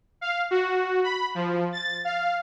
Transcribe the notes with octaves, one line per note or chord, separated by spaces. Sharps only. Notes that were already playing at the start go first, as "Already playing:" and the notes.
F5
F#4
B5
F3
A6
F5